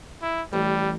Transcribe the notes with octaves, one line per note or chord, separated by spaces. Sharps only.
E4
A1 G3